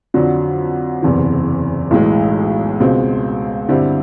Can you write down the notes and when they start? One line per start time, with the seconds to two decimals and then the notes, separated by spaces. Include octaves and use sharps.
0.14 F2 D3 F#3
1.03 F#1 E2 C3 E3
1.91 B1 A2 E3 G#3
2.80 C#2 B2 G#3 C4
3.69 G2 D3 G3 C4 E4